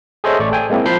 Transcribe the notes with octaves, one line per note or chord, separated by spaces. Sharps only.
G#4 A4 C5 C#5 D#5 E5
A1 A3 D5 C#6
A4 G5 G#5
G#3 A#3 C4 E4
F3 C5 A5 B5 G6 C7